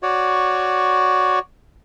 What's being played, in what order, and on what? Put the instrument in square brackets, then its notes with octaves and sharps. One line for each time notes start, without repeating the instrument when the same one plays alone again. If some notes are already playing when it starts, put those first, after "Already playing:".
[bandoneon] F#4 C#5 D5